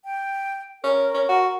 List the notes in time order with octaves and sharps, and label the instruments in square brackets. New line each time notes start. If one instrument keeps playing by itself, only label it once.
[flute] G5
[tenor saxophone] C#4 [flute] A#4
[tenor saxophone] C#4
F#4